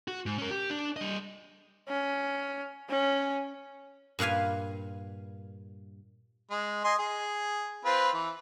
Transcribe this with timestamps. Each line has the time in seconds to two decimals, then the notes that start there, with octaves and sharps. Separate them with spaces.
0.08 F#4
0.26 G#2
0.38 C#4 A#4
0.51 G4
0.70 D4
0.96 G3 D#5
1.89 C#4
2.89 C#4
4.19 G2 A#2 B4 F5 G#5
6.51 G#3
6.84 D#5 G#5 C6
6.99 G#4
7.85 C4 F4 B4
8.14 E3